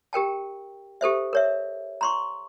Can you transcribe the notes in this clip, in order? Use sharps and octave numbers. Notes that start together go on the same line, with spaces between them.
G4 A#4 G5 A5
G4 A4 C5 E5
A#4 C#5 E5
A#5 C6 C#6